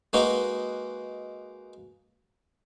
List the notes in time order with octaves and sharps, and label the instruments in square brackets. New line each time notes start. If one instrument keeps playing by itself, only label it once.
[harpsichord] G#3 A#3 D#4 F#4 B4